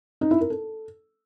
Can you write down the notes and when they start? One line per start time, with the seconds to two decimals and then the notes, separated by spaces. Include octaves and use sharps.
0.21 D#4
0.31 E4
0.41 A#4
0.50 A4